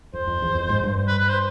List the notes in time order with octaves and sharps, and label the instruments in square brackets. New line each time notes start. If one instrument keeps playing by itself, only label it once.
[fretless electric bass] F2 [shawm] C5
[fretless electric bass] F2
E2
F2
G#2
G2
[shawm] B4
B4
C5